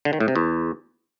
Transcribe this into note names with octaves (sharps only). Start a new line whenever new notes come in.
D3
D#3
A2
C3
E2